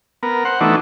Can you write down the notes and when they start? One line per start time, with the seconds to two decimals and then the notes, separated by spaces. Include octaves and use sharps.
0.23 B3 A#4
0.45 C5 F#5
0.60 E3 A3 B3 D4 D#4 F#4